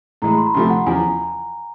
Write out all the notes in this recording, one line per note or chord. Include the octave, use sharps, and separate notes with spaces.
A2 E3 G#3 A#5
B5
C6
B5
D2 C3 F3 A3 C6
F#5
E2 C#3 F3 G#5
A#5